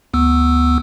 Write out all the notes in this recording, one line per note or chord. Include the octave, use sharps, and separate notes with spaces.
D2 B3 E6